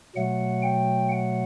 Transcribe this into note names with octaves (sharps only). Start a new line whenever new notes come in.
B2 F#3 A3 F#5
G5
F#5